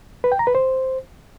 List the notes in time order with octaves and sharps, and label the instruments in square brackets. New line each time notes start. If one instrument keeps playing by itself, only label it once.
[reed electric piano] B4
G5
A#5
B4
C5